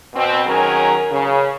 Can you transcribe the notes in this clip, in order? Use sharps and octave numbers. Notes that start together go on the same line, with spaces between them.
B2 C4
D#3 F#3 C#4 G#4 A#4
C#3